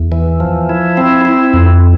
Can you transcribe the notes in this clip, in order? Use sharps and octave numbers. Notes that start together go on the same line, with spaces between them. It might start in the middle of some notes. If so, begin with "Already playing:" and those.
Already playing: E2
E3
F3
E4
C4
E4
F2